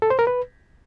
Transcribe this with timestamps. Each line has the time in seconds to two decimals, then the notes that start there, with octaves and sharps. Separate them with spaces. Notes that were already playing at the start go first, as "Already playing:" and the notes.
0.02 A4
0.10 C5
0.19 A#4
0.27 B4